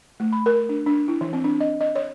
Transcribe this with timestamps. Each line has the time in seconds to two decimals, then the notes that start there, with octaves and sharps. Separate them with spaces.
0.20 A3
0.33 B5
0.46 A#4
0.69 D4
0.86 D4
1.08 E4
1.21 E3
1.33 C4
1.44 D4
1.60 D#5
1.81 D#5
1.96 C#5